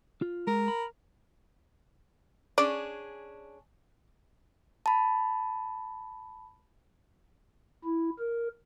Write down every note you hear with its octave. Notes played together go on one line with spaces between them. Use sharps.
F4
G#3 A#4
B5
C#4 D4 G#4 D5
A5 B5
E4
A#4